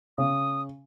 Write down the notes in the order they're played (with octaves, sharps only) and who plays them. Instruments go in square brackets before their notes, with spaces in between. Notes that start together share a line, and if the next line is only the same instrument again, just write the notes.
[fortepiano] C#3 [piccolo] D#6